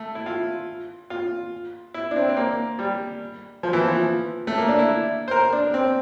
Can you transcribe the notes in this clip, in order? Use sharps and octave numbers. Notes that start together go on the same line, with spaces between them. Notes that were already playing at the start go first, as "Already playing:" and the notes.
Already playing: A3
E4
F4
F4
E4
D4
C4
C4
A#3
G3
F3
E3
F3
A3
A#3
D4
E4
C5
A#4
D4
C4